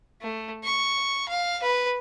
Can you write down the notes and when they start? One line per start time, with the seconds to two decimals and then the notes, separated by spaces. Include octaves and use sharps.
0.22 A3
0.64 C#6
1.28 F5
1.63 B4